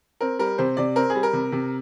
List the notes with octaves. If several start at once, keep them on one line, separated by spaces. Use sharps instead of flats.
C4 A#4
G3 A#4
C3 C5
C3 D5
C4 A#4
G#4
G3
A#4
C3
C3